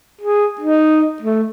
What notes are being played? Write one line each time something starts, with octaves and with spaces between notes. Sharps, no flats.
G#4
D#4
A3